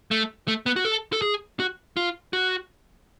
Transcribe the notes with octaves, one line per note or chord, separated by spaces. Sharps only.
A3
A3
B3
F#4
A4
A4
G#4
F#4
F4
F#4